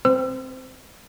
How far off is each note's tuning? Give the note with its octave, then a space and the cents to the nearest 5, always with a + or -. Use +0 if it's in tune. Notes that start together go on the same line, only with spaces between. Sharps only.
C4 +0 C5 -25 E6 +35